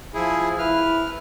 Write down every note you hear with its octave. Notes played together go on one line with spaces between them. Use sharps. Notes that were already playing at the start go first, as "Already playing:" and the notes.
F3 E4 G#4
E4 B4 F6